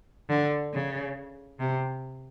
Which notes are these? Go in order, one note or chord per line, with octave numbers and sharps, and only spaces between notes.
D3
C#3
C3